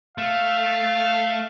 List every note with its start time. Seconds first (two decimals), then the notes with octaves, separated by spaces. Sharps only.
0.18 A3 F5